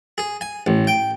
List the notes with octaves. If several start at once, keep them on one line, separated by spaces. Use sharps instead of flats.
G#4
G#5
A1
G5